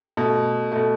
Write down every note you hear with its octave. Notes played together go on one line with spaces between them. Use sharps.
B2 A3
B2 A3